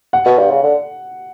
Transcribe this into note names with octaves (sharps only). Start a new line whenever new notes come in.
F#5
B2
G2
C#3
D3